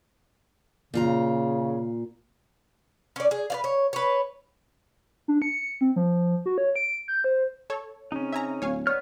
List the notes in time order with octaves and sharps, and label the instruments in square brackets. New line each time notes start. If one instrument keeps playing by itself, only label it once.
[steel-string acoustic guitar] A#2 F4 A#5 [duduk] C#3
[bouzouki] C#4 D5
G#4
B4 D5 F5
C#5
B4 C#5
[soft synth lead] D4
C#7
C4
F3
F#4
C#5
D7
G6
C5
[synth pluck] A4 C#5
[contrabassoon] C#3 [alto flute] C4 [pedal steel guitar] C#4 D#4
[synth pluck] E5 G#5 A#5
[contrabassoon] D1 [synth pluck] C#5 F5 G#5
[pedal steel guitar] B3 F6 [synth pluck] C#5 [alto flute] D5